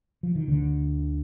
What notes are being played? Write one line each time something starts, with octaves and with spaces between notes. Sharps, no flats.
F3
D#3
D2 D3